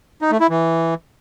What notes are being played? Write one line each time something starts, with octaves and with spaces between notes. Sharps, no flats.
D#4
A3
E4
E3